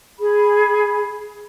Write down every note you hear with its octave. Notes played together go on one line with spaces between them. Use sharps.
G#4 B5